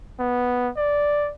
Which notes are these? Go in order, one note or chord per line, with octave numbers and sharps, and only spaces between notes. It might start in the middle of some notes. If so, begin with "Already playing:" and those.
B3
D5